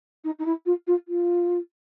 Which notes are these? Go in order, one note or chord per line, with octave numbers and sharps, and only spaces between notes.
D#4
D#4
E4
F4
F4
F4